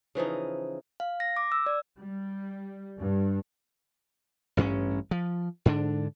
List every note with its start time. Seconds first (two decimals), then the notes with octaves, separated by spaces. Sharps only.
0.15 C#3 E3 F3 D#4
1.00 F5
1.20 A#6
1.37 D6
1.52 E6
1.66 D5
1.99 G3
2.98 G2
4.57 A1 G2 C4 C#4
5.11 F3
5.66 G#2 D3 D4